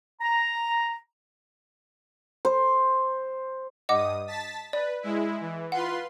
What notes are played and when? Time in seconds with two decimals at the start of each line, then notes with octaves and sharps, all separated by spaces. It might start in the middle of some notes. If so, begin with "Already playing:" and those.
0.21 A#5
2.45 C5
3.89 G2 D#5 F#5 D6 D#6
4.27 A5 A6 B6
4.73 B4 D5
5.02 G#3 E4
5.41 E3
5.72 F4 B4 F#5 C6